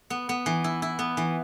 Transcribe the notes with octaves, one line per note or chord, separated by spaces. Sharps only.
B3
B3
E3
E4
E4
B3
E3